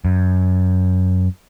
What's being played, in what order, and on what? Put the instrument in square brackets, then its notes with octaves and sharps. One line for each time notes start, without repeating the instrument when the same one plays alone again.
[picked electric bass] F#2